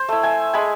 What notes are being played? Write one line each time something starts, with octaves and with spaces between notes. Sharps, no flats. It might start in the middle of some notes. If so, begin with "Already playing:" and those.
Already playing: C5
A3 E4
E5 G#5
G#3 G#5 B5